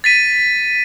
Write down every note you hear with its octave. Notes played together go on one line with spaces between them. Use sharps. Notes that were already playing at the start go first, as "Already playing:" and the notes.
A6 B6 D#7